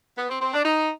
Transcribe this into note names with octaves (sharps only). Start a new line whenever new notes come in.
B3
C4
C4
D4
D#4